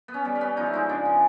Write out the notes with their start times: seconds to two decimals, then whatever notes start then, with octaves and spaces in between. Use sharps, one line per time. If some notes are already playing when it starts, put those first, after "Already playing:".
0.08 B3
0.14 C#4
0.25 G3
0.35 C#4
0.41 B3
0.57 F3 D#4
0.66 E4
0.73 G#3 D#4
0.89 C#3 D4
1.05 C#3